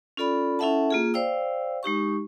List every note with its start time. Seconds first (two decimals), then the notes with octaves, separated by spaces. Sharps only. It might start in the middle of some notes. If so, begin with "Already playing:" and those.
0.17 C#4 F4 A4 D5 B5
0.59 C#4 E4 A4 E5 F#5 A5
0.91 A#3 F4 G#4
1.14 C5 D5 F5 G5 E6
1.83 G#3 D#4 G4 C#6